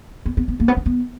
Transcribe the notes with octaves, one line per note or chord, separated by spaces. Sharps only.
B3
B3
B3
A#3
B3
C#4
B3